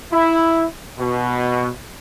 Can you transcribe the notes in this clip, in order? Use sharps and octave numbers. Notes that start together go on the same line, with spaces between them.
E4
B2